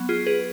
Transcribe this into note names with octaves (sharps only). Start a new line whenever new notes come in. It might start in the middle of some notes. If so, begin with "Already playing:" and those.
Already playing: F#3 B3
F4 G#4
G#4 B4